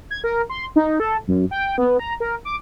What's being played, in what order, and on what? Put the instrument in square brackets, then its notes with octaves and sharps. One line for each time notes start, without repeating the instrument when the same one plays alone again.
[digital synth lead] G#6
A#4
C6
D#4
A4
F#2
G5
B3
A#5
A#4
D6